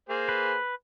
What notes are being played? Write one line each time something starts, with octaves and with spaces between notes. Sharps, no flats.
A#3 G#4 C5
B4